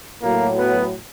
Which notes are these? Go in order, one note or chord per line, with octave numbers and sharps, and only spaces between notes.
A2 F#3 A#3
B3